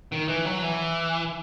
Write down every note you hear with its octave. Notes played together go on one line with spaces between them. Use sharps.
D#3
E3
F#3
E3